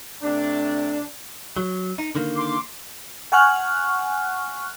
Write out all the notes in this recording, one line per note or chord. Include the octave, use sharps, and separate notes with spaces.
C3 A3 D4
F#3
D#4
D3 D#3 A#3
C6 D6
F#5 G#5 C#6 F6 F#6